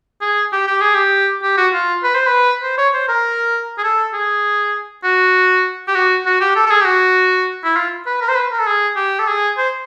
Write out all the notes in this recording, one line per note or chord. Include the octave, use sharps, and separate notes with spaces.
G#4
G4
G4
G#4
G4
G4
F#4
F4
B4
C5
B4
C5
C#5
C5
A#4
G#4
A4
G#4
F#4
G4
F#4
F#4
G4
A4
A4
G#4
G4
F#4
E4
F4
B4
A#4
C5
B4
A#4
A4
G#4
G4
A4
G#4
C5